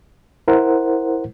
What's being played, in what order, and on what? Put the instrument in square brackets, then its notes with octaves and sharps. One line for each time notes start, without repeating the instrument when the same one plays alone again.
[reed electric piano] E4 A#4 C5 F#5